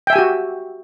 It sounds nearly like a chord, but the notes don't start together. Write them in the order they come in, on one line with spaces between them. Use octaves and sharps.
G5 E5 G#5 G4 F#4